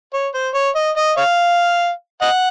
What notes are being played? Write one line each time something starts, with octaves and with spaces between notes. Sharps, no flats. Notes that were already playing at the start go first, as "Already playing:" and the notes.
C#5
C5
C#5
D#5
D#5
C#5 F5
D#5 F#5